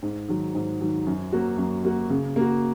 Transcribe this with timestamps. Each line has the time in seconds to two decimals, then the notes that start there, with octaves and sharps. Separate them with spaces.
0.03 G#2
0.28 D#3 F#3
0.55 G#2
0.80 D#3 F#3
1.07 F#2
1.32 F#3 A#3 F#4
1.58 F#2
1.84 F#3 A#3 F#4
2.10 C#3
2.36 A#3 F#4